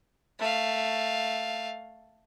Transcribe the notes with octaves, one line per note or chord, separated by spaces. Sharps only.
A3 F5